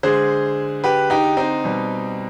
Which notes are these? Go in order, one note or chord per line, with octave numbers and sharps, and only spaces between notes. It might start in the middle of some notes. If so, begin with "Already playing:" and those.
D3 G#3 G#4 C5
G4 B4
D#4 G4
C4 D#4
B2 G3